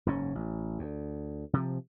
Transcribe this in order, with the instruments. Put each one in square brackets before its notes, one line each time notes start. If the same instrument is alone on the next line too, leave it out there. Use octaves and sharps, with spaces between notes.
[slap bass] F#1 G#2 C#4
A1
D2
C3 F3